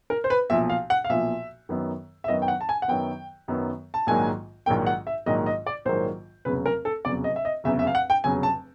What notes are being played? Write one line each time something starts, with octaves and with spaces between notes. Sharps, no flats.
A#4
C5
B4
B1 A#2 F3 E5
F5
F#5
F5
B1 A#2 F3 E5
F#2 D#3 F#3 B3
E5
F#2 D#3 F#3 B3 D#5
G5
F#5
A5
G#5
F#5
F#2 D#3 F#3 B3 G5
F#2 D#3 F#3 B3
A5
A#1 G#2 D#3 F#3 A#3 G#5
A#1 G#2 D#3 F#3 A#3 G5
F#5
E5
A#1 G#2 D#3 F#3 A#3 D#5
D#5
D5
A#1 G#2 D#3 F#3 A#3 C5
F1 E2 C#3 F#3 B4
A#4
A4
F1 E2 C#3 F#3 D5
D#5
E5
D#5
F1 E2 C#3 F#3 E5
E5
F5
F#5
G5
F1 E2 C#3 F#3 G#5
A5